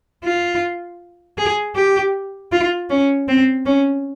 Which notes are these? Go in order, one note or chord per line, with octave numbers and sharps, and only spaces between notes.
F4
G#4
G4
F4
C#4
C4
C#4